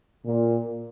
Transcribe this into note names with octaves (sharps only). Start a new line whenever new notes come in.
A#2